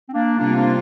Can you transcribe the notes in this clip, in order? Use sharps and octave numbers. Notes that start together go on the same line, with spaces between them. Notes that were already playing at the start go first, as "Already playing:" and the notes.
C4
A#3 D4
C3 G3 A#3 C4 D4 F4
A#3 D4